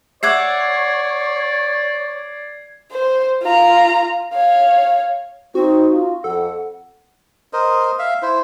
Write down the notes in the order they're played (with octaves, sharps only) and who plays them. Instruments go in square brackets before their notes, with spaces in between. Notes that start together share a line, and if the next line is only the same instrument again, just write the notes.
[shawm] C#5 [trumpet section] D5 [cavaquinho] E5 F#5 D6 [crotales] G#6 C7
[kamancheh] C5
F4 A#5
C#5 F5
[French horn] C4 [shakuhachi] D#4 [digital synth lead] F#4
[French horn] F4
[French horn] F2 [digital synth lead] A4 [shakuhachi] F#5
[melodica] A#4 C5 D#5
E5 F5
E4 C5